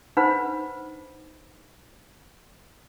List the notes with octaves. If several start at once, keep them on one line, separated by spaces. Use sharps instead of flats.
D4 D#4 B4 C5 F#5 B5